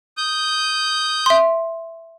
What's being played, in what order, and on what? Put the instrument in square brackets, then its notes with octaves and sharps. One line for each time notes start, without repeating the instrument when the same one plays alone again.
[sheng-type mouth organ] D#6 G6
[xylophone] E5 C6